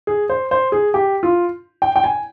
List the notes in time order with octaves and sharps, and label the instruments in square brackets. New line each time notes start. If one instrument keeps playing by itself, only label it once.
[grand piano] G#4
C5
C5
G#4
G4
F4
G5
G5
G#5